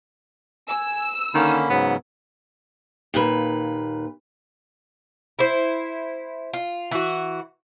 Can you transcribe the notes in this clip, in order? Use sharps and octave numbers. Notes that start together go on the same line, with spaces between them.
G#5 E6
D3 D#3 A#3 C#4 B5
G#2 C#3 F#3 B3
D#2 A#2 B4
E4 C5
F4
E3 F#4